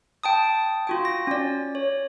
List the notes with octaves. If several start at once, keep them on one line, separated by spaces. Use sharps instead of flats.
G5 A5 D#6
F4 F#4 G5
A#6
C#4 D5
C#5